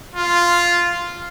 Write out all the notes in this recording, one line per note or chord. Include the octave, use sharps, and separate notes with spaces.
F4